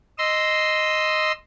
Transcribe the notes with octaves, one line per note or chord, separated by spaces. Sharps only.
D#5 C6 E6